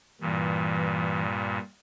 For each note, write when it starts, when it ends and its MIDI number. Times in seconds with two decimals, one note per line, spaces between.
0.21 1.58 43
0.21 1.58 46
0.21 1.23 52